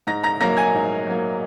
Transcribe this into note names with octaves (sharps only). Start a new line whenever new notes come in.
G#2 A#5 A#6
A#5 A#6
F#3 A#3 A#5 A#6
G#5 G#6
G#2
F#3 A#3